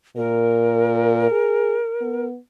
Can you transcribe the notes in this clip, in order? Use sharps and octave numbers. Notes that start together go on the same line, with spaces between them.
A#2 A#4
G#4
B3